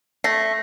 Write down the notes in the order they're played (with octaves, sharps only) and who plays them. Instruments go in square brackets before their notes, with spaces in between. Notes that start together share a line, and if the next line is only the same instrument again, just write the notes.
[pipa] A3 [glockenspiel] A#6 C7